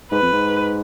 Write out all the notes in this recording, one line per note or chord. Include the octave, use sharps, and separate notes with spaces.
G#2 B4
F2
G#2